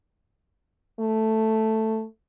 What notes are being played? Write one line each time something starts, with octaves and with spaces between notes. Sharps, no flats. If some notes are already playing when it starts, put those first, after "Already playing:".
A3